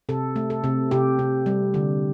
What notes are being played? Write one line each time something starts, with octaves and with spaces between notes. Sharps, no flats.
C3 A4
A3
A4
C3
C3 G4
C3
G3
D3